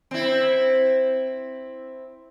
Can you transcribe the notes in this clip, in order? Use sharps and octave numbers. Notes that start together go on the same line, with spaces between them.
C4 E4